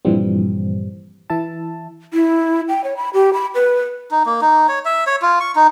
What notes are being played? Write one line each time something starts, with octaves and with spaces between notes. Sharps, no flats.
G2 A#2 E3 F3 G3 C4
E3 E4 E5 A5
E4
G5
C#5
B5
G4
B5
B4
D#4
A#3
D#4
C#5
E5
C#5
F4
C#6
D#4